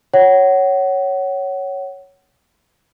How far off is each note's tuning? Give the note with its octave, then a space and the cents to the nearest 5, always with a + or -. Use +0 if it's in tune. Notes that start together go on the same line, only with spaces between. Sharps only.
C#5 +0 F#5 +25